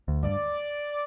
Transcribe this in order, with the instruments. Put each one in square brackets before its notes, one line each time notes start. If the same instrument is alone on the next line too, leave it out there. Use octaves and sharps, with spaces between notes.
[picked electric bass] D2
[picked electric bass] G2 [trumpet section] D5